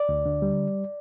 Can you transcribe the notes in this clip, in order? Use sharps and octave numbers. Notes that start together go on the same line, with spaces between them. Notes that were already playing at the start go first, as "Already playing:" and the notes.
Already playing: D5
D2
D3
G3